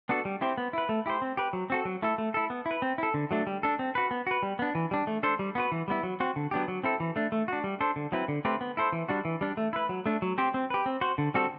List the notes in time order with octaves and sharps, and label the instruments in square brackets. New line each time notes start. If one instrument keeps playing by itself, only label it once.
[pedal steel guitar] B3 D4 F#4 A4
G3
C4 E4 G4 C5
B3
E4 B4
A3
E4 G4 C5
C4
G4 B4
F#3
C4 F#4 A4
F#3
A3 E4 A4
A3
E4 A4
B3
E4
B4
C4
E4 A4
D3
F#3 A3 D4
G3
D4 A4
C4
F#4 B4
B3
F#4 B4
G3
B3 D4
E3
G3 D4
A3
D4 A4 C5
G3
B3 F#4 B4
E3
G3 B3 E4
F#3
C4 F#4
D3
F#3 B3 D4 G4
F#3
C4 E4 A4
E3
A3 D4
A3
D4 F#4
G3
D4 A4 C5
D3
F#3 C4 E4 B4
D3
A3 C4 G4 B4
B3
E4 A4 C5
E3
G3 D4 F#4
E3
G3 D4
A3
E4 B4
F#3
A3 D4
F#3
C4 G4 C5
C4
G4 B4
C4
F#4 C5
D3
G3 C4 F#4 A4